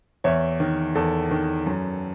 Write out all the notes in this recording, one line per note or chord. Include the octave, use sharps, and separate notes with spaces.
E2 C#5 E5
D#3
E2 A4
D#3
F#2